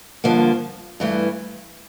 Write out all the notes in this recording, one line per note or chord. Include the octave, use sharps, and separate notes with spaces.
G2 D3 F3 A#3
G2 E3 A3